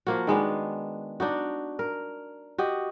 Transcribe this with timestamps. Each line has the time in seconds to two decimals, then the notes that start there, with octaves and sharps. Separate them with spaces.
0.07 F3 A#3 F#4
0.27 D#3 G#3 B3 D4
1.20 D4 D#4 F#4
1.79 A#4
2.58 F#4 G4 D#5